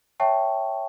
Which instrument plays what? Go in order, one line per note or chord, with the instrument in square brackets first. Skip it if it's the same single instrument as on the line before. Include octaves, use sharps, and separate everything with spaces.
[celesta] C#5 E5 G5 A5 C#6